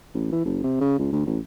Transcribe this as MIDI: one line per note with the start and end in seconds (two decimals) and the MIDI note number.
0.14 0.29 33
0.32 0.45 52
0.46 0.61 30
0.64 0.79 48
0.81 0.98 49
0.98 1.10 37
1.13 1.22 38
1.26 1.39 33